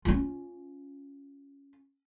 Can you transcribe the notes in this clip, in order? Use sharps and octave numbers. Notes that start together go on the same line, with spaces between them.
C#4 F4